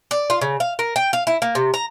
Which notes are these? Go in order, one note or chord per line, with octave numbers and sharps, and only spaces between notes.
D5
F4
C#3
F5
A#4
G5
F5
E4
A#3
C3
A#5